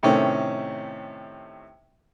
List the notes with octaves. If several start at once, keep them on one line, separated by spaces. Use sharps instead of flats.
A2 C3 D#3 A3 C4 C#4